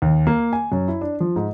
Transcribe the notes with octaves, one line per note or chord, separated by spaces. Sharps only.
D#2
A#3
G#5
F#2
E4
D4
F3
G#2